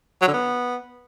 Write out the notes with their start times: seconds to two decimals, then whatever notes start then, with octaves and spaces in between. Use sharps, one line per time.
0.22 F#3
0.28 D3
0.34 B3